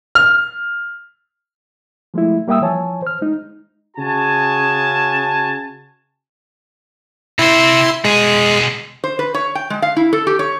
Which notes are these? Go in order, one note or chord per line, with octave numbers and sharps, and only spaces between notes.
F6
F3 G#3 A3 E4
G3 A#3 E5 G5 D#6 E6
E3 F3 C#5 G#5 A5
C5 F6
G#3 D#4
C#3 F#4 G#5 A5
C3 E4 C5 C6
B2 G#3 G#4
C5
B4
C#5
G5
G#3
F5
E4
A4
G4
C#5